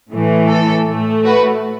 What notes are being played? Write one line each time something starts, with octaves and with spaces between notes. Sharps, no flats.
A2 E3 A3
A4
A2 A3
F#4 B4